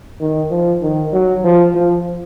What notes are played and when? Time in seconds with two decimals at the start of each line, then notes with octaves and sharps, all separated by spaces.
0.21 D#3
0.51 F3
0.83 D#3
1.13 F#3
1.44 F3
1.75 F3